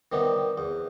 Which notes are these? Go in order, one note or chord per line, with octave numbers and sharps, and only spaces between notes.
C3 D#3 G3 B3
E2